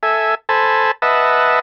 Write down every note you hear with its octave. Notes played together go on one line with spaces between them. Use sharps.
A4 E5 G#5
A4 C5 G#5 A5 B5
B4 D#5 E5 F#5 A5